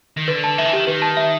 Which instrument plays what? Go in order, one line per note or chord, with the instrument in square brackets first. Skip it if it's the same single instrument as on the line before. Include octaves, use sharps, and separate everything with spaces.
[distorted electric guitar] D#3
[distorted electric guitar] D3 [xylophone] B4
[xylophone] A5
[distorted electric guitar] D#3 [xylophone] E5
[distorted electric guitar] E3
[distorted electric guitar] D#3 [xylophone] G4
[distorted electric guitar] D#3 [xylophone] B4
[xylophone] A5
E5